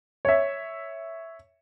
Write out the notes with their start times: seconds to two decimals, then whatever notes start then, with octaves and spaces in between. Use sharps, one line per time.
0.25 C#5 E5